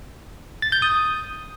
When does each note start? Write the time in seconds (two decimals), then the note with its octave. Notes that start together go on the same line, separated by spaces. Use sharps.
0.62 A6
0.72 G6
0.82 D#6